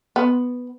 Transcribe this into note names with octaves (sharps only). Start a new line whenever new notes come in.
B3